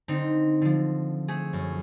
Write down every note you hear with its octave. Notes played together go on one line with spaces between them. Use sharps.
D3 C4 D#4
D3 F3
A3 G#4
F#2